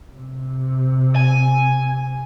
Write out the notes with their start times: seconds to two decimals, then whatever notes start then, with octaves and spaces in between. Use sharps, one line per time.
0.15 C3
1.16 G#5